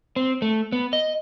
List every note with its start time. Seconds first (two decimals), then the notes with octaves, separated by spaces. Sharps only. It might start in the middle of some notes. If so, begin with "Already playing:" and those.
0.16 C4
0.42 A3
0.72 B3
0.93 D#5